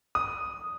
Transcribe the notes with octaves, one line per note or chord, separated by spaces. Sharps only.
D#6